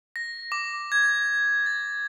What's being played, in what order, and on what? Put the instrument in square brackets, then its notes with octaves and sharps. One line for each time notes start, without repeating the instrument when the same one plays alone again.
[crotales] A#6
D6
G#6
A6